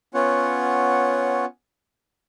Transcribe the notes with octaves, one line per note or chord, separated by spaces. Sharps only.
B3 C#4 F4 C#5 F#5